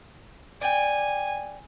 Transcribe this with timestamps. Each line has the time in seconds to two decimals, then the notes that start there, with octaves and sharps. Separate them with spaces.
0.61 D5 G5 G#5